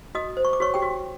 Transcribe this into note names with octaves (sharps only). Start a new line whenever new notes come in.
F#4 D#5 D#6
C5
C#6
D6
F#4 C#5 C#6
G4 G5
F#4